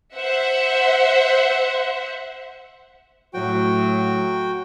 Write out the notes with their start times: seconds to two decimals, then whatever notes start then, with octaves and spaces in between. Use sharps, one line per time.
0.15 C5 E5 F#5
3.34 A2 F#3 F#4 G5